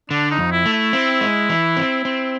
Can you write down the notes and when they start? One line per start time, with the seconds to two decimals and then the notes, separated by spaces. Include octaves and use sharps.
0.10 D3 D4
0.31 D#4
0.38 F2
0.52 E4
0.66 A3
0.73 E4
0.93 C4
1.21 G#3
1.50 E3
1.77 C4
2.05 C4